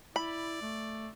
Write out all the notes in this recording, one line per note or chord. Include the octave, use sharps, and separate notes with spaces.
E4 D5 B5
A3